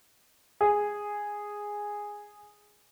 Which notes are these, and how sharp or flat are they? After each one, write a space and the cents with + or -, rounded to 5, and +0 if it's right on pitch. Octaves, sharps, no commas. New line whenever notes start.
G#4 -5